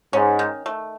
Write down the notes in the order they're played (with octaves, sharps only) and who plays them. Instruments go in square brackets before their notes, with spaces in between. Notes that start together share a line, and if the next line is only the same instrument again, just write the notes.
[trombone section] G#2 [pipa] C#4
[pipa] D#3
A3